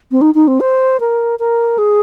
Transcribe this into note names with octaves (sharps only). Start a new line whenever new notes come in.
C4
D#4
D#4
C4
C5
A#4
A#4
G#4